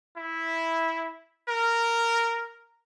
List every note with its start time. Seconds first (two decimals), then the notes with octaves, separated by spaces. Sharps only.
0.17 E4
1.49 A#4